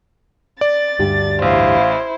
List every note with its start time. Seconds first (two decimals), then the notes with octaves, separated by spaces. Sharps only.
0.61 D5 A6
0.99 D2 G2 G4
1.42 A1 E4 C5 F5